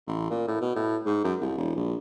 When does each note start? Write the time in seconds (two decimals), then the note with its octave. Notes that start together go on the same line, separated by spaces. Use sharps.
0.07 A1
0.30 A#2
0.48 A2
0.61 B2
0.76 A2
1.06 G#2
1.24 F#2
1.41 C2
1.58 E1
1.76 A#1